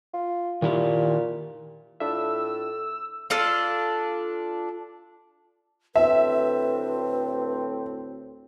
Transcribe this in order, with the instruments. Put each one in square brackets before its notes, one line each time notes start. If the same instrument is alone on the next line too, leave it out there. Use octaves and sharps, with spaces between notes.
[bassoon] F4
[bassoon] A#2 [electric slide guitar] D#3 E4 G4
[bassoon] A2 [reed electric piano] D4 F4 E5 [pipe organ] E6
[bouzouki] D4 F4 A4 F5
[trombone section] D2 A2 C4 [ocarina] B4 [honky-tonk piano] E5